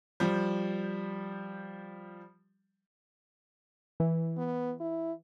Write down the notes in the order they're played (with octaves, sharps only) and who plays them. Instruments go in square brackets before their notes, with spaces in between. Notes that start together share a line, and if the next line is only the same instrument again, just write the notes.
[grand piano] F3 G3
[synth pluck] E3
[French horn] B3
E4